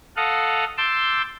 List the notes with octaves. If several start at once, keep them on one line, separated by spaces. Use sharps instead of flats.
A4 D#5 F5 F#5
A5 C6 D6 E6 G6